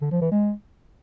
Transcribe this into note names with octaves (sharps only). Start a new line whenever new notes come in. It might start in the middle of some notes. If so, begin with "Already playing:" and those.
D3
F3
E3
G#3